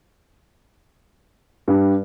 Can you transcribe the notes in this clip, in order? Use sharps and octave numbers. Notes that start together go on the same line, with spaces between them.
G2